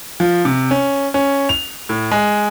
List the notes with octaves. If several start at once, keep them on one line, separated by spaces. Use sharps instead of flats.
F3
C3
C#4
C#4
F7
A2
G#3